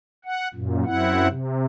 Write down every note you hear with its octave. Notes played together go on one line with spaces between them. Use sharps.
F#5
F#2 A#2
F#2 C4 E4 F#5
C3